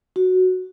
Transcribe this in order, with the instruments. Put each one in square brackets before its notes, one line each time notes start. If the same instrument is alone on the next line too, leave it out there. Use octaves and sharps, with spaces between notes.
[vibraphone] F#4